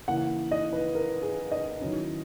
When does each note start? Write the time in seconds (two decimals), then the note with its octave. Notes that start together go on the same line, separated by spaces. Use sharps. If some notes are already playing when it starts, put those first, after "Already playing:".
0.08 C#3 E3 A#3 E4 F#5
0.51 D#5
0.73 B4
0.95 A#4
1.22 G#4
1.52 D#5
1.80 D#3 F#3 C#4 E4